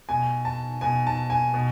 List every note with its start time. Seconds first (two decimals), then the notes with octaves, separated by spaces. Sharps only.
0.09 B2 G#5
0.45 A5
0.81 B2 G#5
1.07 A5
1.30 G#5
1.54 B2